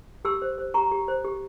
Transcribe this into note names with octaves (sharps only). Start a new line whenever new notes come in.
G4 C6 E6
C5
C5
G4 A#5 C#6
G4
C5
G4